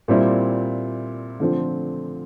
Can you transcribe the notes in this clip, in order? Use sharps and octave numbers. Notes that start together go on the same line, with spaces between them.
A#2 G3 C4 E4
D3 F3 A3 C4